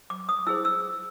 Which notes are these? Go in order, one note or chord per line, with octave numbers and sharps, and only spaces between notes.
D6
D#6
E4 G#4 C5 E6
E6